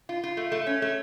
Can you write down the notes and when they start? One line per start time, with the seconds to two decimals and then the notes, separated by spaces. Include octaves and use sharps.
0.09 F4
0.24 F4
0.37 A3
0.52 A3
0.67 C#4
0.82 A3